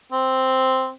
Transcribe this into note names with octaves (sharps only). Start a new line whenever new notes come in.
C4